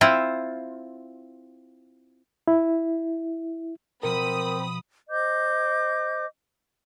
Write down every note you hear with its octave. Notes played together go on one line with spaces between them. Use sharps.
C4 E4 F4
E4
B2 F3 C4 A#4 B5 D#6
C5 D#5 D6 G6